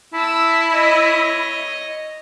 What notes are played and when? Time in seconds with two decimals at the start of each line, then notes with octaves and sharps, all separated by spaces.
0.13 E4 A5 E6
0.70 C#5 D#5